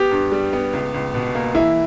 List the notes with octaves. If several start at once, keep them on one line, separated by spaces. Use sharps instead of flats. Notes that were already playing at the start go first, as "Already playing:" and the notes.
Already playing: B3 G4
G2
G3
B3
C#2
C#2
B2
A#3
E3 E4